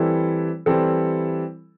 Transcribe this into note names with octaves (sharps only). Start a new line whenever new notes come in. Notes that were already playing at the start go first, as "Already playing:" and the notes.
Already playing: E3 G3 C4 E4 A4
E3 G3 C4 E4 A4